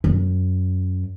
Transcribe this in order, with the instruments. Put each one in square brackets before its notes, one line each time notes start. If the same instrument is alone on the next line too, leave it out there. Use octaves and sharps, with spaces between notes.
[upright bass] F#2